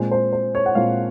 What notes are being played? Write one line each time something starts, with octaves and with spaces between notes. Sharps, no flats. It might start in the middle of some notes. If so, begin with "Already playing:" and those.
Already playing: A#2 G#3 C4 C5
C5
C5
C#5
F#5
A#2 G#3 C4 F5